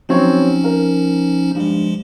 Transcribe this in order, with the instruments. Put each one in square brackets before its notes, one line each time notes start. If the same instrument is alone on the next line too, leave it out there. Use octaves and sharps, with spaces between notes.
[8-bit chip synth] F3 C#4 D#4 [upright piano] F#3 C4 C#5
[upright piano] A#4
[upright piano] G2 [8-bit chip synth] F3 G#3